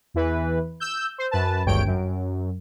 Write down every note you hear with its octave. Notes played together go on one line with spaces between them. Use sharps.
E2 E3 B4
E6 G6
C5
F#2 B4 A5
G#1 D2 G2 C#5 G5 D7
F#2